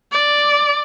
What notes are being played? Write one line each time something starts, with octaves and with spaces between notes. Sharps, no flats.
D5